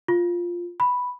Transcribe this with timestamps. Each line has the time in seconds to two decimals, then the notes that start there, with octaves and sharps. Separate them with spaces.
0.08 F4
0.80 B5